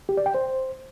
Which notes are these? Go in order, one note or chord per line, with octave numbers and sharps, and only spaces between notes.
G4
D5
G5
C5